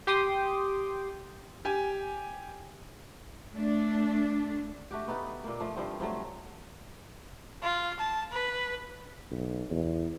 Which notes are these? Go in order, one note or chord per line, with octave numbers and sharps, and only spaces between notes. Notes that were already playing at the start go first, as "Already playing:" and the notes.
G4 G5 C6 D6 D#6
G4 G#5
A3 D4
A3 F#4 G4
B3 D#4 A4 B4
A#2 A#3
F3 A3
G2 F3 C4
G2 F3 F#3 A3
F4
A5
B4
B1
E2